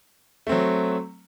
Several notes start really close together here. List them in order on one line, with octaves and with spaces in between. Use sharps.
A3 C4 F#3